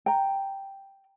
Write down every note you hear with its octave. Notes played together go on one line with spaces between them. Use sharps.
G5 A#5